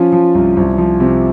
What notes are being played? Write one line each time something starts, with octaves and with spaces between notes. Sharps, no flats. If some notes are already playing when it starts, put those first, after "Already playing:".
Already playing: F3 C#4 F4
F3
C2
C2
F3
C3